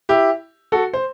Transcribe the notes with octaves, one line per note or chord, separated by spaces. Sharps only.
E4 G4
F#4 A4
C5